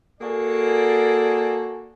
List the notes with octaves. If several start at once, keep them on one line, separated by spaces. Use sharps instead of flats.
A#3 F#4 G#4 A4 D5 G#5